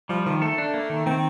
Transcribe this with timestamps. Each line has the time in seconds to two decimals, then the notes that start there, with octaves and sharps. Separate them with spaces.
0.09 F3 G3
0.26 D#3 F3
0.42 A3 A4
0.58 D4
0.74 A#3
0.90 D#3
1.06 D#3 C4